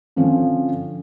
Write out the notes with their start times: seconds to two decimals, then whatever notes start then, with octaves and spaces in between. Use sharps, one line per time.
0.16 D3 F3 C4 C#4